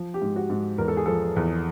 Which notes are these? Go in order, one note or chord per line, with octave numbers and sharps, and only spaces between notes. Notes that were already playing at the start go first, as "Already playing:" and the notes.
Already playing: F3
G4
G#2
F#4
G#2
E2 A#4
A4
G#4
F3 A4
E2